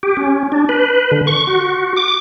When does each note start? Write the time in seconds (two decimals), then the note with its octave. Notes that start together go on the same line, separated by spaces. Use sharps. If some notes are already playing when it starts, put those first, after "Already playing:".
0.03 G4
0.17 C#4
0.52 D4
0.69 B4
1.11 D3
1.27 C#6
1.47 F#4
1.97 D6